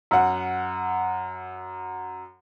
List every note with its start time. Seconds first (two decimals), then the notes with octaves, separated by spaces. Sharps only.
0.11 F#2 F#5